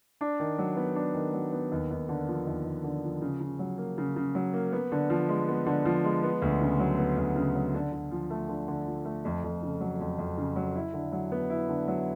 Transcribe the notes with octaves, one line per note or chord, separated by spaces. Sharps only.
D4
D#3
F#3
B3
D4
D#3
F#3
B3
D#2
D#2
D3
F3
D#2
D#2
D3
F3
C#3
C#3
F#3
A#3
C#3
C#3
F#3
A#3
B3
D3
F3
G#3
B3
D3
F3
G#3
B3
D2
C#3
F#3
B3
D2
C#3
F#3
D3
D3
F3
A3
D3
D3
F3
A3
F2
F2
C#3
F#3
F2
F2
C#3
F#3
E4
D3
F#3
B3
E4
D3
F#3